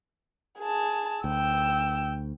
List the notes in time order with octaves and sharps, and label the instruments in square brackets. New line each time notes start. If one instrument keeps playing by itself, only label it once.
[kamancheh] G#4 A5
[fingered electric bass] D2 [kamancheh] G5 E6